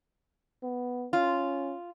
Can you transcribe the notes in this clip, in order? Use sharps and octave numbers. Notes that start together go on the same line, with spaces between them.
B3
C#4 F4